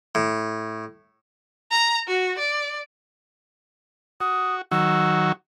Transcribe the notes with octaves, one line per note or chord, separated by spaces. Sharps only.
A2
A#5
F#4
D5
F#4 D#6
D#3 F#3 F#4 E6